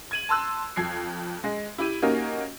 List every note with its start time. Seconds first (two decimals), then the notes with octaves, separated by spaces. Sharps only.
0.11 G#6 D#7 F#7
0.29 A5 C6 E6 F#6
0.76 F2 G#6 C7
1.44 G#3
1.78 E4 G4 D#7
2.02 A#3 C#4 D#4 F#4 G4 A#4